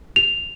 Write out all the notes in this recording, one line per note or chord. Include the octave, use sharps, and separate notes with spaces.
F7